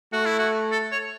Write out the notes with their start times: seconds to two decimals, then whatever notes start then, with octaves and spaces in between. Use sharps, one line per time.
0.13 A3 F#4
0.26 E4
0.39 F#4
0.72 A4
0.92 C#5